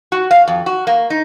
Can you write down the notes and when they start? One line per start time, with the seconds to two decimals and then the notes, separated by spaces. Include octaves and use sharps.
0.12 F#4
0.31 F5
0.48 F2
0.66 F#4
0.87 A#3
1.10 D#4